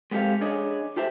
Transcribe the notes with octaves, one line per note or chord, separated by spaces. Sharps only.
G#3 B3 C4 G4 A4 F5
D4 G#4 C#5 D#5
F4 G4 A4 C5 E5